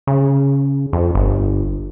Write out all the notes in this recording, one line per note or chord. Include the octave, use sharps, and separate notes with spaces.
C#3
F2
G1